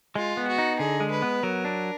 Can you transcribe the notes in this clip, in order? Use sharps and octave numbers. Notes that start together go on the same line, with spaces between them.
G#3 F4
B3
F#4
D#4
D3 G#4
G#3
B4
B3
F#3 A#4
D4